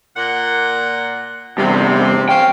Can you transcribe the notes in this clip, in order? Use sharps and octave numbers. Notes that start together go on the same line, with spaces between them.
A#2 F#5
E2 G2 C3
C#4 C5 F5 G5